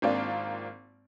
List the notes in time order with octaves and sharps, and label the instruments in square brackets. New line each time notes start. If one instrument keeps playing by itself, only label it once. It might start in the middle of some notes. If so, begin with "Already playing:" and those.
[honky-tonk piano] G#1 A#3 C4 D4 F4